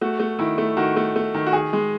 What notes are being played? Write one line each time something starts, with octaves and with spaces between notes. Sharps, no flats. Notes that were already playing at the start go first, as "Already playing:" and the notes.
A3 F#4
A3
D#3 E4
A3
D#3 F#4
A3
A3
D#3
F#4
D#3 G#4
G#3